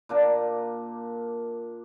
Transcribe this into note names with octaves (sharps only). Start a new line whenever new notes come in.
A#2 A#3 D4 A#4